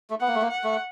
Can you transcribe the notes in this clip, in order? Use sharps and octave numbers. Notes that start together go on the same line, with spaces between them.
A3
B3 F#5
A#3
A3
A#3
F#5
A3